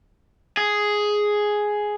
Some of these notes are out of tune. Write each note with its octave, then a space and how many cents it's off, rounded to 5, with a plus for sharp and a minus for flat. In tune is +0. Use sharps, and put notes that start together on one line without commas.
G#4 +5